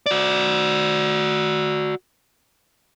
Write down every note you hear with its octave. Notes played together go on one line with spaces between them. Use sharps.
F#4 D5